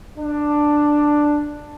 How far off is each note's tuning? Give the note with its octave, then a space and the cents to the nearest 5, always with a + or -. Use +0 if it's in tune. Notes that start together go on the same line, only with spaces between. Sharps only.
D4 +5